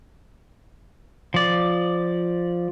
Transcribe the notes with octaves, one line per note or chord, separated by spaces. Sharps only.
F3 D5